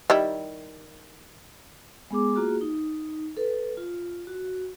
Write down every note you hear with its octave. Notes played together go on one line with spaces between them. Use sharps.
D#3 G3 E4
G#3 B3 G#4 D6
A#3 F4 F#4 G#4
D#4
A4 B4
F4
F#4